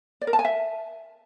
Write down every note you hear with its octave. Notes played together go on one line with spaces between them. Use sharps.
D5
A#4
A5
G#5
E5